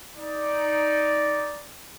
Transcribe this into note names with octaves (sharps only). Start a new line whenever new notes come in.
D#4 D5